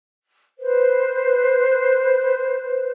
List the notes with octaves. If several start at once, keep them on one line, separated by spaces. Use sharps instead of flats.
B4 C5